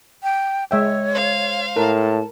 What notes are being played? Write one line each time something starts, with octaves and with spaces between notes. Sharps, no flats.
G5
G#3 C#5 E5 G5
C5 F5
A2 A#4 A5